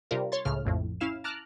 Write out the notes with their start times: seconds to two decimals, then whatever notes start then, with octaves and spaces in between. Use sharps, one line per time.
0.11 C3 G3 D4 F4 A#4
0.32 C#5 C6 A6
0.45 C#2 A2 C#3 F6
0.65 A#1 F2 A2
1.00 C#4 E4 F5 E7
1.24 A5 A#5 D6 F6 F#6